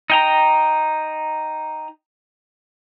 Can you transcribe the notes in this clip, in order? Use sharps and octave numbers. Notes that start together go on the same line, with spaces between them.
D#4 G5 A#5